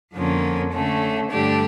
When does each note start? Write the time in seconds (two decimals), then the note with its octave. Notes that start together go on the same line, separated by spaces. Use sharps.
0.14 F2 D3 F3 A#3 C#4
0.73 D3 A3 C#4
1.31 G2 D3 A3 D4 G4